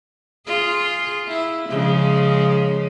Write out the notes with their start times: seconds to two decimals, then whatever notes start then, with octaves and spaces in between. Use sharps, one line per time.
0.47 F4 G#4
1.28 E4
1.69 C#3 F3 G#3